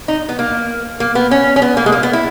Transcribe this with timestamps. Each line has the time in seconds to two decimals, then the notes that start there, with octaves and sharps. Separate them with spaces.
0.08 D#4
0.29 B3
0.39 A#3
1.00 A#3
1.15 B3
1.31 C#4
1.56 C#4
1.62 B3
1.77 A#3
1.86 G#3
1.92 A#3
2.03 B3
2.13 E4